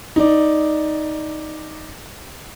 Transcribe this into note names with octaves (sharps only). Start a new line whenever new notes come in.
D#4 D5